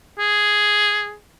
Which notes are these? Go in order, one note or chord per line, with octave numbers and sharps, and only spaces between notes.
G#4